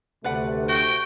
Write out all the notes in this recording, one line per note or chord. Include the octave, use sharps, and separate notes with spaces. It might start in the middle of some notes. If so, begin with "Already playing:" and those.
D2 C3 A3 B4 D5 F#5
F#4 G5